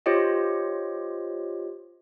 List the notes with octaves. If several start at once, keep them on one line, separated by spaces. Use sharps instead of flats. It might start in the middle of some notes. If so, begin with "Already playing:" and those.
F4 G4 C5 C#5 D#5